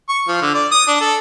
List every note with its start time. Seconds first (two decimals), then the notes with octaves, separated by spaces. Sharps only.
0.09 C#6
0.28 F3
0.42 D3
0.54 D5
0.72 D#6
0.88 D4
1.01 A4